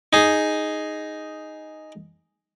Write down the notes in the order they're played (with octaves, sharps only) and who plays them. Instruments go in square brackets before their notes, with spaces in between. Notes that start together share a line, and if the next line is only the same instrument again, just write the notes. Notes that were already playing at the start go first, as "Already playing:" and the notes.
[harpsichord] D#4 G#4